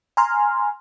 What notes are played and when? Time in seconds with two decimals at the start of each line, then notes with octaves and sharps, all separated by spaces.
0.17 G#5 A#5 C6 F6